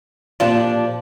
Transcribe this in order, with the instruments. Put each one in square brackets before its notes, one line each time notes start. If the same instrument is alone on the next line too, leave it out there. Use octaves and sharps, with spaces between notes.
[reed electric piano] A#2 F4 [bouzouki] F3 D4 G4